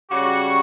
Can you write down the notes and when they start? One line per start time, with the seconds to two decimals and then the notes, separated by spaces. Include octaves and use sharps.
0.10 C#3 G3 C#4 F#4 D6
0.44 C#6